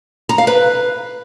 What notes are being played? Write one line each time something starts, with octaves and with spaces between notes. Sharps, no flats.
A#5
F5
B4